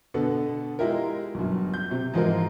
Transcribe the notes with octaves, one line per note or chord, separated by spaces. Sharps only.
B2 D3 B3 A4
G#3 E4 F4 G4 A#4
G1 F#2
G6
C3
G#2 E3 F3 G#3 F4 A#4